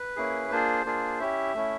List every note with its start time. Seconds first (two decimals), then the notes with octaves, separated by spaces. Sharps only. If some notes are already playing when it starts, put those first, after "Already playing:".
Already playing: B4
0.16 A#3 C#4 E4 G#4
0.51 A#3 D4 F4 G#4 C5
0.85 A#3 D4 F4 G#4
1.20 C#4 E4 G4 E5
1.54 A3 C#4 E4